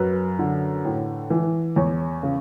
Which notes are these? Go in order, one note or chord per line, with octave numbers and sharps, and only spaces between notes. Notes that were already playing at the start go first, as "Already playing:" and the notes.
Already playing: F#2 B4
D3
A2
E3
E2 C#5
C#3